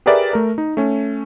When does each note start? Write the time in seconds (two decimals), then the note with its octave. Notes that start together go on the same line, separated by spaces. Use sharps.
0.06 G4 G#4 A#4 B4 D5 E5
0.33 A3 A#4
0.58 D#4
0.77 A3 C#4